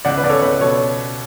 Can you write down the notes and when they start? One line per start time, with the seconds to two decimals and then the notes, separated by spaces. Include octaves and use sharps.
0.05 C#2 D5 F#5
0.18 B4
0.23 C#2 D5
0.30 A4 C#5
0.42 C#2 B4
0.61 B2 A4 C#5